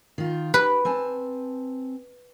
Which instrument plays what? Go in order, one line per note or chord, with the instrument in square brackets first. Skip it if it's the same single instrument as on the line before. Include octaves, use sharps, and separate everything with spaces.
[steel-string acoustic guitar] D#3 F4
[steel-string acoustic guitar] G4 [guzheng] B4
[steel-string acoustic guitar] C4 G#5 A5